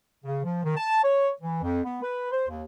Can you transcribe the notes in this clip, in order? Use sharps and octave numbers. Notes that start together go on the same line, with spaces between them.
C#3
F3
D#3
A5
C#5
E3
F2
B3
B4
C5
D#2